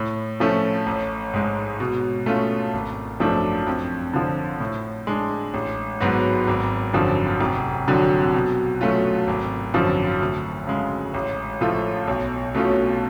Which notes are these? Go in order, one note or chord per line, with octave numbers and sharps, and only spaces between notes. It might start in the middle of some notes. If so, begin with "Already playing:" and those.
Already playing: A2
F3 A3 C#4
A1
G#2 G#3
B2
A3 C#4 F4
G#1
F#2 F3 A3 D4
F2
D3 F3
A2
G#3 D4
A1
G#2 F#3 B3 F#4
G#1
F#2 D3 F3
F1
F2 D3 F#3
B2
F#3 A3 C#4 F4
G#1
F#2 D3 F3
D2
C#3 G#3
A1
A2 F3 A3 F4
B1
B2 A3 C#4 F4